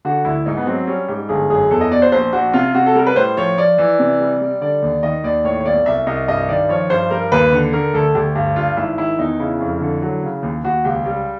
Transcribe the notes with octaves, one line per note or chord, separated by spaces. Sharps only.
D3 F#4
D2 E4
G#2 D#4
B3
F#3 C4
G3 C#4
G#2 G4
G1 G#4
F#2 G#4
E2 A4
D#5
B2 D5
C5
A#1 C5
A#1 F#4
C3 F4
C3 F#4
A4
G3 A#4
B4
A2 C5
F3 C#5
F3 D5
E3
C3
G3
G3
D3 D5
D#2
D#3 D#5
D#2 D5
A2 C#5
C#5
B1 D5
C2 E5
C2 D#5
G2 D#5
D#3 D5
F3 C#5
G2 C5
G3 A#4
D#2 B4
D3
D3 A#4
D2 A4
D2 G4
G2
G2 F4
G#1 E4
D#3 E4
E2 D#4
C#3 E4
F2
D3
F#3
C#3
D#2
D#2 F#4
C#2 G4
G3